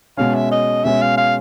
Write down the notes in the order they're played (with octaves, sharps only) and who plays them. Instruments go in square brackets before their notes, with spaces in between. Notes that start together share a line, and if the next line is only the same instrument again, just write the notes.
[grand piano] B2 G#3 C#4 [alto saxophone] F5
[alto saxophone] E5
D#5
[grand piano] B2 G#3 C#4 [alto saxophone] E5
[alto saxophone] F5
F5